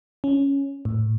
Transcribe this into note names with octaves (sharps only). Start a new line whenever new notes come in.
C#4
A2